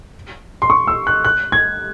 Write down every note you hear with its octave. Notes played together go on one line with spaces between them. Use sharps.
C6
C#6
E6
F#6
F#6
G#6